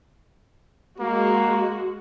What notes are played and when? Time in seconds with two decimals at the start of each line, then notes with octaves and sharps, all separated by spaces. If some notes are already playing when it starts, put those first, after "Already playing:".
1.00 G#3 A#3 F#4